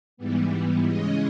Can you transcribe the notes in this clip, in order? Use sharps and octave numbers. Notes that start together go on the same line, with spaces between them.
G#2 E3 G3 B3
C#3 E3 G#3 C#4 D#5